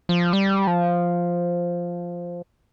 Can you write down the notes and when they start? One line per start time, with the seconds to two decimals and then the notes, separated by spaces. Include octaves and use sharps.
0.09 F3
0.33 G3
0.67 F3